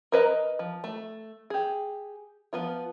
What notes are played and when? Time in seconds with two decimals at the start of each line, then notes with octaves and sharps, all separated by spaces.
0.12 A#4 B4 D#5 A#5
0.59 F3
0.84 A3
1.50 G4 G#4
2.53 F3 B3 F4